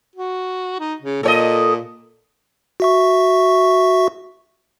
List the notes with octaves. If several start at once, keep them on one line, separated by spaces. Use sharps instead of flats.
F#4
D#4
C#3
A#2 A4 C#5 D#5
F#4 E5 C#6